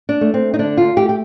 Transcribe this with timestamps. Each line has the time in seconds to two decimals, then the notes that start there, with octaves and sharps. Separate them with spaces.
0.09 D4
0.21 A3
0.34 C4
0.54 D#4
0.59 D3 D4
0.77 F4
0.96 A3 G4
1.09 G4